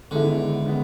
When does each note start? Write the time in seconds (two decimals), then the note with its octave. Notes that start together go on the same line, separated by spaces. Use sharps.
0.11 G#2 D3 D#3 G#3 B3 E4
0.66 D#3 G#3 B3